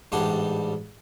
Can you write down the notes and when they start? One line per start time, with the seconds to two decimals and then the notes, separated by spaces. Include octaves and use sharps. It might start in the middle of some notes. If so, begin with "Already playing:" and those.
0.12 A1 G#2 G3 D4 F#5 C6